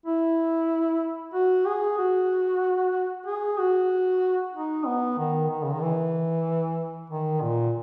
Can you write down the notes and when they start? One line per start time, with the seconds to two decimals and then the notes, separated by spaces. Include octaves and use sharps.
0.06 E4
1.34 F#4
1.66 G#4
1.98 F#4
3.26 G#4
3.58 F#4
4.54 D#4
4.86 B3
5.18 D#3
5.50 D#3
5.63 C#3
5.73 D#3
5.82 E3
7.10 D#3
7.42 A#2